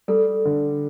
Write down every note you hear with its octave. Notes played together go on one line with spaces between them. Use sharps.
G3 A4
D3